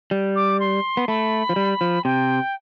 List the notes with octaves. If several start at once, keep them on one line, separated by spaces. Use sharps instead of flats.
G3
D6
C6
B3
A3 B5
F3
G3
F3
C3 G5